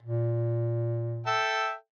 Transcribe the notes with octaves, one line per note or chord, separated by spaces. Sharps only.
A#2
A4 E5 G5